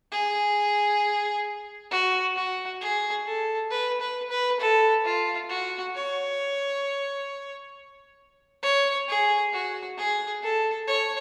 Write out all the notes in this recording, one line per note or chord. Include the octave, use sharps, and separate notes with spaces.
G#4
F#4
F#4
G#4
A4
B4
B4
B4
A4
F4
F#4
C#5
C#5
G#4
F#4
G#4
A4
C#5